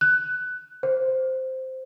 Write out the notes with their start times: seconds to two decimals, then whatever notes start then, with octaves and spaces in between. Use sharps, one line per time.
0.01 F#6
0.83 C5